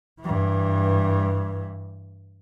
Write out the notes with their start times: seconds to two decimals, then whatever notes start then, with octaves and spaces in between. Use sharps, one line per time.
0.20 G2 E3